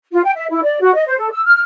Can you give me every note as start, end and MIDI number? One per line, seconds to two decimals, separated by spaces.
0.12 0.20 65
0.24 0.31 79
0.35 0.45 76
0.50 0.62 64
0.62 0.78 74
0.80 0.93 66
0.94 1.05 75
1.06 1.16 72
1.18 1.30 69
1.30 1.42 88
1.46 1.61 89